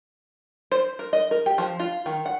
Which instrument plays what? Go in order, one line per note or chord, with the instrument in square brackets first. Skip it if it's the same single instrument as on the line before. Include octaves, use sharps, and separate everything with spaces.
[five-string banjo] C5
A#4
D#5
A#4
G4
F3
F4
D#3
F#5